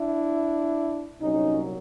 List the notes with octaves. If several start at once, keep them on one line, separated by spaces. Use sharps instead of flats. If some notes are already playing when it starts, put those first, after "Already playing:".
Already playing: D4 E4
C2 A#2 F#3 C#4 D#4